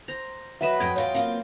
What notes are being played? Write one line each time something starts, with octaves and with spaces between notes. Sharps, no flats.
C5 A#5
F#3 B4 D#5 E5 E7
F2 D#5 G5 G#6
E2 F4 C#5 G5
A#3 C4 F4